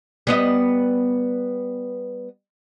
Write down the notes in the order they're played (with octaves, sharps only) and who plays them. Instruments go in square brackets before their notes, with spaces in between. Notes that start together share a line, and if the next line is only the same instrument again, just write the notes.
[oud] G3 B3 D#5